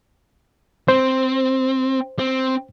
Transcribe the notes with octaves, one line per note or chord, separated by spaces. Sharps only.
C4 C5
C4